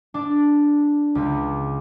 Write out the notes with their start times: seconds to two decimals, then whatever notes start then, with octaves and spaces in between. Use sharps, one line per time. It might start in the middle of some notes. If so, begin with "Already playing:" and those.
0.14 D4
1.15 C#2